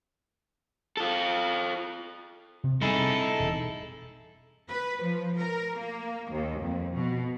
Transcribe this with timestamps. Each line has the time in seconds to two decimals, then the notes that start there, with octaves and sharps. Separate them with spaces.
0.97 F4 A4
2.64 C3
2.82 G3 C4 D#4 E4 G#4 A4
3.40 E1
4.69 B4
5.03 F3
5.38 A#4
5.77 A#3
6.31 D#2
6.60 F2
6.95 B2